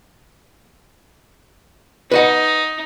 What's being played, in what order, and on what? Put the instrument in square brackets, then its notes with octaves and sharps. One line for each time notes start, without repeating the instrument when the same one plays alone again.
[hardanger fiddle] D#4 [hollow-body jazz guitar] B4 D#5 F#5